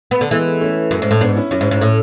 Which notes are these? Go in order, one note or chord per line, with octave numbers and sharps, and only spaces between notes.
B3
D3
E3 G#3 B3
A3 C#4
F#2
G#2
A2
G#2 B3 D4
C#4 E4
F#2 C#4 E4
G#2
G#2
A2